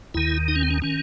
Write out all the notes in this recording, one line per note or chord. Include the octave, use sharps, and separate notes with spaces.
D#2 D#3 E4
D#4
C#4
C4
C#4
D#3 C#4